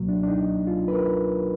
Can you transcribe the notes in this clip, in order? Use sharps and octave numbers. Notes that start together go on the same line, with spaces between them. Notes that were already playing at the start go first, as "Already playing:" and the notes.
Already playing: C#2 B2 F#3 A#3
D4
D4
D#4
F4
B4
A#4